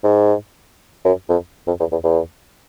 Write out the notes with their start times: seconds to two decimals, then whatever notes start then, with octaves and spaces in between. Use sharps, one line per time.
0.04 G#2
1.05 F#2
1.29 F2
1.67 F2
1.80 E2
1.92 E2
2.04 E2